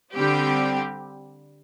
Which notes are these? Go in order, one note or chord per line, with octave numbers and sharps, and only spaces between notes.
D3 G3 C4 G4